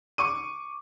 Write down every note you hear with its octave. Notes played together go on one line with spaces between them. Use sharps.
C#6 D6 D#7